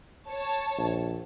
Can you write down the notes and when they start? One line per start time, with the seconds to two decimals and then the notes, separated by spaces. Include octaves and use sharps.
0.29 C#5 A5
0.78 A#1